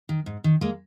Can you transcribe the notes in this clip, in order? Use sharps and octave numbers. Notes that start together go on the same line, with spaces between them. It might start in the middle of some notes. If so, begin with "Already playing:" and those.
D#3
G#2
D#3
G#3 A#3